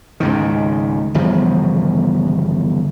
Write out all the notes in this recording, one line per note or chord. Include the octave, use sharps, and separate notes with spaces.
C#2 G#2 D#3
G1 E2 C#3 F3